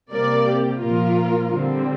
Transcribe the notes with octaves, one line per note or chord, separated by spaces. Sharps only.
C3 G3 A#3 A#4 D5
G4
A#2 F3 A#3 F4 A#4
D3 G3 C4